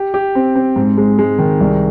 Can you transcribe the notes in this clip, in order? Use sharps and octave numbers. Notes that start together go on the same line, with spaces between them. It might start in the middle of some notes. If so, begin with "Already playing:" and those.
Already playing: G4
G4
C4
C4
G#2
G#3
G#3
D#3
C2